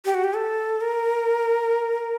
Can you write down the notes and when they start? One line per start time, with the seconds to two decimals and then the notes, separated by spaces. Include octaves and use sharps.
0.05 G4
0.14 F#4
0.24 G4
0.34 A4
0.81 A#4